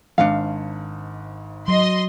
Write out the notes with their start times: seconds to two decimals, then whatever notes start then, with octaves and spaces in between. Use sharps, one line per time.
0.18 G#1 G#2 D4 F5 C#7
1.68 F#3 D#5 C6